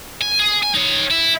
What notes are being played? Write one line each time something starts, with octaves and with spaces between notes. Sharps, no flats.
G#5
G#4
G#5
D#4 C#5
E4